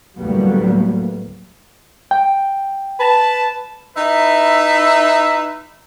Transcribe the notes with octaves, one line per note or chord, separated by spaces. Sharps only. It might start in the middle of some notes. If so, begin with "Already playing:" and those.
D2 A2 F#3 G3 A#3 B3
G5
B4 A5
D#4 E4 B4 E5